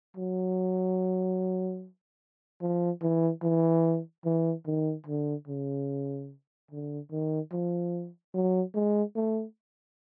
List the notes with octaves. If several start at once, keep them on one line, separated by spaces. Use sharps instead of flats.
F#3
F3
E3
E3
E3
D#3
D3
C#3
D3
D#3
F3
F#3
G#3
A3